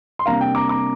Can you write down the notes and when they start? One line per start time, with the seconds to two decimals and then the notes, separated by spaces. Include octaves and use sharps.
0.19 C6
0.26 C3 G3 A#3 D4 F5 A#5
0.41 G5
0.55 A#5 D6
0.69 A#5 D6